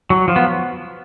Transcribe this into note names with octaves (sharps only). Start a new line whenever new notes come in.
F#3
F3
B3